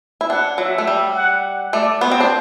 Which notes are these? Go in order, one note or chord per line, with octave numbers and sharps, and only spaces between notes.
E4
D4 F#5
F#3 E5
A3
G3
F#5
A3 D5
B3 C5
C4
D4